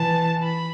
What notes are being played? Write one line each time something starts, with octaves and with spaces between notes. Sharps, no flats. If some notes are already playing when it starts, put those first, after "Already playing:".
Already playing: E3 A5
B5